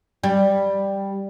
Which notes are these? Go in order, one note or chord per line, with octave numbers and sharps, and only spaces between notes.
G3